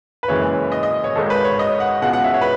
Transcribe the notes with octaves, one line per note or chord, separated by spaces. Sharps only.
B4
F#1 F#2 E3 G#3 C#5
D#5
D#5
C#5
G#1 G#2 D#3 G#3 A4
B4
C#5
D#5
F#5
C#2 B2 G#3 F#5
F#5
E5
C#5
B4